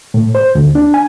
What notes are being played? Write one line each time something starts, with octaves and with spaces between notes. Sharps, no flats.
A2
C5
D2
D4
G#5